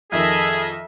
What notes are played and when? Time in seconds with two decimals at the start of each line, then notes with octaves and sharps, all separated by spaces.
0.12 F2 D#3 G#4 A4 D#5 E5